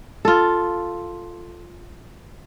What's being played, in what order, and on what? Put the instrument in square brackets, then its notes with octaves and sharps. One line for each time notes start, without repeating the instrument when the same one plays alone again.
[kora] F4 A4